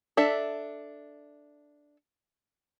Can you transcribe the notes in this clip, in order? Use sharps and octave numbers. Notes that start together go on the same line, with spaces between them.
D4 A4 E5